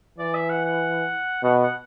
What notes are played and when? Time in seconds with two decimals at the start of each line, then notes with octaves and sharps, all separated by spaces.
0.18 E3 D5
0.34 E5
0.50 F#5
0.65 F#5
1.43 B2 F#5
1.63 F#5